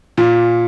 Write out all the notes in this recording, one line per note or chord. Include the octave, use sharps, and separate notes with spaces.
A#2